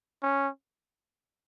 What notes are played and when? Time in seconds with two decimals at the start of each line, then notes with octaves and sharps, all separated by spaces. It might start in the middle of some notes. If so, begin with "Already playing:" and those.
0.23 C#4